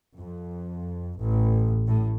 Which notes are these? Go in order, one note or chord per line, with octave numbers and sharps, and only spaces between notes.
F2
A1
A2